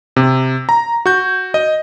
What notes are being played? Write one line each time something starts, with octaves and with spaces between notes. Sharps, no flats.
C3
A#5
F#4 G6
D#5